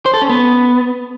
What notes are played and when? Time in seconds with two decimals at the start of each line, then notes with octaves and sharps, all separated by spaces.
0.06 C5
0.14 A4
0.22 C#4
0.29 B3